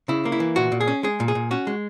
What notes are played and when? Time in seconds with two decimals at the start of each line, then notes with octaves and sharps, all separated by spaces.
0.08 C#3 E4
0.25 A#3
0.32 E4
0.40 E3
0.56 A#2 F#4
0.72 A#2
0.81 G#4
0.88 C#4
1.03 G#3 G#4
1.20 A#2
1.28 G#4
1.35 A#2
1.51 C#4 F#4
1.67 G#3